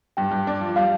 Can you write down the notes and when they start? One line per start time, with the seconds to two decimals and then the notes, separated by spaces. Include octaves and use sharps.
0.17 G2 G5
0.31 G2
0.47 D4
0.61 F3
0.76 G3 F5